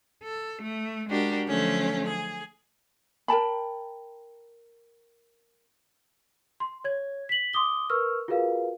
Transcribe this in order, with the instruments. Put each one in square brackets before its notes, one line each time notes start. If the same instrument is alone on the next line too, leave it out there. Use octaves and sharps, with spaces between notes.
[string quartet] A4
A3
G#3 D4 F#4 G4 A#4
D3 F3 F#3 A3 C#4
G#4
[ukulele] A#4 G5 A5 B5
[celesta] C6
C#5 G#6
B6 F#7
C6 D6 D#6 G7
A#4 B4 C#6 E6 F6
F4 F#4 G#4 A#4 B4 F5